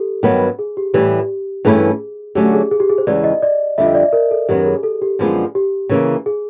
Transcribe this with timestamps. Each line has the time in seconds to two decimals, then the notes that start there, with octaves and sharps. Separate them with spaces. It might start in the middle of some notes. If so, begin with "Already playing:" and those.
Already playing: G4 A4
0.23 G2 D#3 F#3 B3
0.59 G#4
0.77 G4
0.94 A2 E3 G3 G4
1.65 G2 E3 A3 C#4 E4 G#4
2.35 D3 F#3 A3 C#4 G4
2.53 G#4
2.71 G#4
2.80 G4
2.90 G#4
2.98 C5
3.07 E2 C#3 E3 G#3 D5
3.24 D#5
3.42 D5
3.78 F2 D3 G3 E5
3.86 D#5
3.95 D5
4.13 A#4
4.31 A4
4.49 F#2 D#3 F#3 B3 G4
4.66 G#4
4.83 A4
5.02 G4
5.19 F#2 D3 F3 G#3 B3
5.55 G4
5.89 C#3 E3 G3 A#3
6.26 G#4